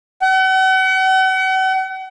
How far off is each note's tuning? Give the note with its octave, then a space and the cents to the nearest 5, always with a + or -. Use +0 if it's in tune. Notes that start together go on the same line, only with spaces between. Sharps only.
F#5 +40